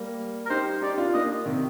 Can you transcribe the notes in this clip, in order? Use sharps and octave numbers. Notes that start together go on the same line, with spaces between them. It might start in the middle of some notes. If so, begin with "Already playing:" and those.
Already playing: G3 A#3
A#4
D#4 G4 C5
D#4 G4 D5
D4 F4
A#3 D4 D#5
C3 D#3